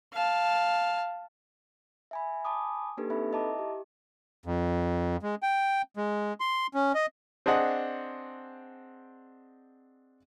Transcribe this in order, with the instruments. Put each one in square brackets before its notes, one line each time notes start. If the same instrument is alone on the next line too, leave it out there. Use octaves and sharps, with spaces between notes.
[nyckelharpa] F5 A5
[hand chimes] E5 G#5 B5
G#5 A5 B5 D6 D#6
A#3 D4 D#4 G4 A4 B4
C4 D#4 A4 B4 E5 B5
E4 D#5 E5 A5 A#5 D6
G4
[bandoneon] F2
G#3
G5
G#3
C6
C#4
D#5
[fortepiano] C4 D4 G#4 D#5 F#5